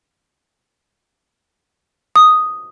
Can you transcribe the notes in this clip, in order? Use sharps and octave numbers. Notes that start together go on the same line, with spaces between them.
D#6